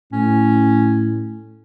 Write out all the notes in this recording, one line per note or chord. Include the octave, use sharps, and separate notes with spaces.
A2 C#4